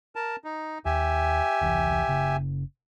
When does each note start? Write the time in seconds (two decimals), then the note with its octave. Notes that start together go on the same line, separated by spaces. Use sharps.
0.16 A#4 A5
0.44 D#4
0.85 D#2 G4 E5 G#5
1.61 E1 C2 E3
2.07 F#1 C#3